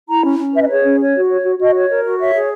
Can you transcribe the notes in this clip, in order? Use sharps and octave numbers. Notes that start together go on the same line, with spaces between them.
E4 A#5
C#4
C#4
B4 E5
D#5
G#4 C#5
C#4
C#5
F#4
C#5
F#4
F#4 D#5
C#5
A#4
F#4
C#5 E5
G#4